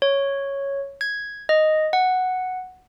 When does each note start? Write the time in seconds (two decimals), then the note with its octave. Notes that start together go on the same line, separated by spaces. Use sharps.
0.02 C#5
1.01 G#6
1.49 D#5
1.93 F#5